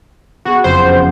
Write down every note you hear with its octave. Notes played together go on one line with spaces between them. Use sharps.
B3 F#4 G#4
F#1 F2 C5